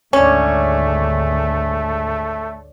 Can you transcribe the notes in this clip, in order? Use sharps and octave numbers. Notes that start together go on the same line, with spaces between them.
G#1 D2 G#3 A3 C#4 C#5 D5